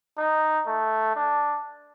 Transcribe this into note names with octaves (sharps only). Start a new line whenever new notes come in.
D#4
A3
D4